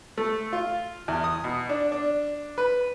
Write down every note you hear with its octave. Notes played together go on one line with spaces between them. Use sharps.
A3
F4
E2
D#6
B2
D4
D4
B4